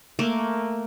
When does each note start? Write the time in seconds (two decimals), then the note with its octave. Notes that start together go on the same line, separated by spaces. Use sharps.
0.19 A3 A#3